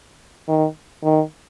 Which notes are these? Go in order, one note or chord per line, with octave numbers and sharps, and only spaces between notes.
D#3
D#3